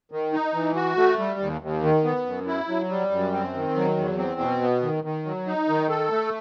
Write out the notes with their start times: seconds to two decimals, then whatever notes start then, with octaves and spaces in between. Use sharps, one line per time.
0.12 D#3
0.33 D#4
0.54 E3
0.76 F#4
0.97 A3
1.19 G3
1.40 D#2
1.61 D#2
1.83 D#3
2.04 B3
2.25 F#2
2.47 E4
2.68 F#3
2.90 G3
3.11 F#2
3.33 C4
3.54 D#3
3.76 F#3
3.97 E2
4.18 C4
4.40 B2
4.61 B3
4.82 D#3
5.04 D#3
5.25 F#3
5.47 D#4
5.68 D#3
5.89 A4
6.11 A3